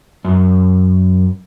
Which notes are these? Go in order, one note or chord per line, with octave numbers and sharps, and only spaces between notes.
F#2